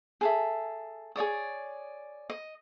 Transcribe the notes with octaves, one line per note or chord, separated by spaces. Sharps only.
G#4 A4 E5
G#4 C#5 D5 D#6
D#5